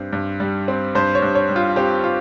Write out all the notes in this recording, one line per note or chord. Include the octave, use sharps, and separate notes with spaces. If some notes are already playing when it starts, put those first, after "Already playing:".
Already playing: G2 C4
G2
G3
C4
G2 C5
C#5
G2
C#5
G3
F4
C4 G4
F4